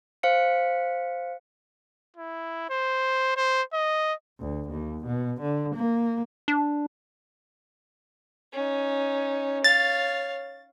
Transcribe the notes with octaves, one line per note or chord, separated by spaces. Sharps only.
C5 F5 C#7
E4
C5
C5
D#5
D2
D#2
B2
D3
A#3
D4
C#4 D#4
C#5 F5 A6